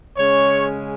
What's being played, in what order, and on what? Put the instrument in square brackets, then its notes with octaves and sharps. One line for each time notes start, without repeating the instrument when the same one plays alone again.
[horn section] C#3 G#3 C#4 C#5